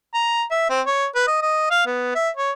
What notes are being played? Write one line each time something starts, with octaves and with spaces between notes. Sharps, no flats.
A#5
E5
C4
C#5
B4
D#5
D#5
F5
B3
E5
C#5